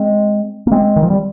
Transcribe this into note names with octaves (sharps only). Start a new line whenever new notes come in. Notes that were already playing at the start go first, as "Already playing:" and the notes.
Already playing: G#3 C4
A#3
G#3 C4
D#3
F3
G3